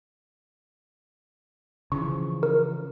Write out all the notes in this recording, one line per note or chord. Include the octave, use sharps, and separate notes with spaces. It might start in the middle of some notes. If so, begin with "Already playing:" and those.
C#3 E3 F3 C#6
A#4